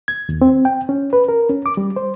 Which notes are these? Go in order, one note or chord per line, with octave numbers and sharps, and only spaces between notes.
G#6
D#2
C4
G5
C#4
B4
A#4
C#4
D6
G3
C5